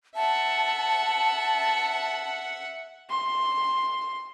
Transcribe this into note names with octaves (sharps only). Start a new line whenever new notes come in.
E5 F#5 A5
C6